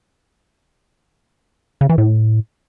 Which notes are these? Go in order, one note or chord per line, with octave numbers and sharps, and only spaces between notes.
C#3
E3
A2